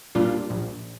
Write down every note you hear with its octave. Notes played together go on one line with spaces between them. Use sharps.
A#2 G3 D4 F4
A#1